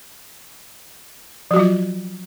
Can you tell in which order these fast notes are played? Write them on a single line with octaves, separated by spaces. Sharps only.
F3 F#4 F#3 F4